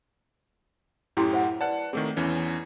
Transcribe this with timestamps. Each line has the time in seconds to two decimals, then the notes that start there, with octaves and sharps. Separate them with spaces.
1.17 F#2 A2 E4 G4 G5 C6
1.33 C5 E5 F#5
1.61 B4 D5 F#5 A5
1.93 D#3 A3 C4 G#4
2.17 E2 E3 C#4